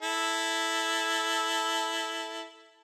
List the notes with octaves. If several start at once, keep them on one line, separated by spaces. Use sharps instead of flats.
E4 A4